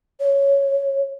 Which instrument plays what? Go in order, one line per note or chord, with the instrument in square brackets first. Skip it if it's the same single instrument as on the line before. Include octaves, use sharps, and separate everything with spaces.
[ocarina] C#5